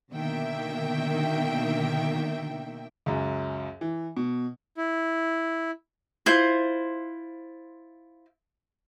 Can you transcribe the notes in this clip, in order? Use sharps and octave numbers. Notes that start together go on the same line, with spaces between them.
B2 D3 D#3 A#3 E5 G5
C#2 F#2
E3
B2
E4
E4 F4 C5